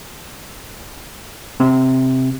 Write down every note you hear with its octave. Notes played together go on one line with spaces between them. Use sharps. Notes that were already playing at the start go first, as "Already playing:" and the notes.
C3